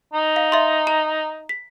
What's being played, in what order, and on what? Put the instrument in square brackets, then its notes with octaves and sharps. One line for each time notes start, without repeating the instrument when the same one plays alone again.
[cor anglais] D#4
[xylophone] F5
E5 C6
A#5
B6